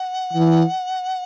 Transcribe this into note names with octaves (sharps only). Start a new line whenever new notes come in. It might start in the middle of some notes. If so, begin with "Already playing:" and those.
Already playing: F#5
E3